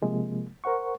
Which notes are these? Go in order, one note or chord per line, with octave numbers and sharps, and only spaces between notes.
C3 F3 G#3 A#3
A#4 C5 F#5 C#6